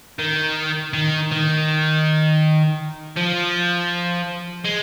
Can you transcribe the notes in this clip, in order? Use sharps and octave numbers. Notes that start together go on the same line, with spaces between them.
D#3
D#3
D#3
F3
G#3